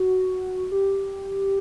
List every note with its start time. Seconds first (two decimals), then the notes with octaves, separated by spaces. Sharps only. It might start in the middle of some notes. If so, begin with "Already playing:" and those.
Already playing: F#4
0.71 G4